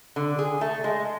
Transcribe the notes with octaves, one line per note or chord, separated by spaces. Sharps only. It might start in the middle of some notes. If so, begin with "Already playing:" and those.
D3
G#4
A3
G#3